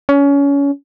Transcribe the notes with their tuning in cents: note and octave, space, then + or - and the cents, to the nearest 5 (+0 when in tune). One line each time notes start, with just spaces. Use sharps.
C#4 +25